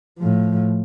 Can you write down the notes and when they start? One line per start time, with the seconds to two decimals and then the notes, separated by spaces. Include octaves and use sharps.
0.19 A2 F3